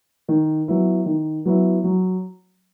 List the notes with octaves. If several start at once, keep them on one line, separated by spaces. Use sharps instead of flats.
D#3
F#3 B3 E4
D#3
F#3 B3 E4
F#3